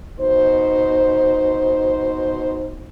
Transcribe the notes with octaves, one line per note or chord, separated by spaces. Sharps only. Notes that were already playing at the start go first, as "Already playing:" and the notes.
B2 D#4 C5